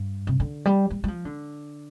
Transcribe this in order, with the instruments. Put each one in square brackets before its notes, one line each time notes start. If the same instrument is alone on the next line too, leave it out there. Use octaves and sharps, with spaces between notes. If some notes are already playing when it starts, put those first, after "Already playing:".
Already playing: [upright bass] G2
C3
D3
G3
G3
G3
F3
D3